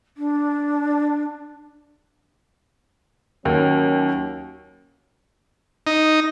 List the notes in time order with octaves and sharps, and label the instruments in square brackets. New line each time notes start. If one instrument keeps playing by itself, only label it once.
[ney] D4
[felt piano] D#2 [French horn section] F#3 C#4
[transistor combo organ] D#4